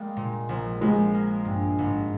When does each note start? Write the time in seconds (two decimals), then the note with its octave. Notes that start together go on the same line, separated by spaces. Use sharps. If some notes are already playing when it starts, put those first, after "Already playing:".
Already playing: G3 G#3 A#3
0.17 A#2
0.49 A#1
0.81 A#1 G#3
1.14 A#3
1.45 G2
1.79 G#1